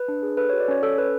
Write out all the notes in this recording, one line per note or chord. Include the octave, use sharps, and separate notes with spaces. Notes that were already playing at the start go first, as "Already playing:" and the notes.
Already playing: B4
D4
G#4
A4 B4
F#4 C#5
D5
C#4 C#5
C#4 A4
A4 B4